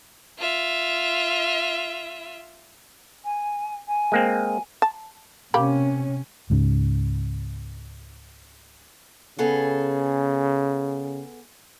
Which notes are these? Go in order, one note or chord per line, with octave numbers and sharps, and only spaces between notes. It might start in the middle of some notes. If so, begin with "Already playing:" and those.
F4 E5
G#5
G#5
G#3 A#3 C4
A5
C3 A#3 C#4 G4 B5
C#2 G#2 C#3
C#3 B3 G#4 A4